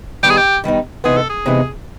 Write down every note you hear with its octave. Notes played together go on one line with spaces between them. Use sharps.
D#3 G3 B3 D#4 G4
G#4
G4
D#3 G3 B3 D#4
C3 E3 G#3 B3 D#4 G#4
A4
G#4
C3 E3 G#3 B3 D#4